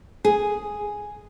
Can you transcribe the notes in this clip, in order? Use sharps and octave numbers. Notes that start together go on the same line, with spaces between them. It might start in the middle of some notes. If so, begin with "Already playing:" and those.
G#4